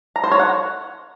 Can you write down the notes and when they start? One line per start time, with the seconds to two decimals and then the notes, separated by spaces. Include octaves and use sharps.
0.16 A#5
0.24 C5
0.31 C#5
0.39 F#5